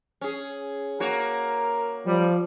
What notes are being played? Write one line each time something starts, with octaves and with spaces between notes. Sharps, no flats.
C#4 G#4
A#3 F#4 A#4 C#5
F3 G3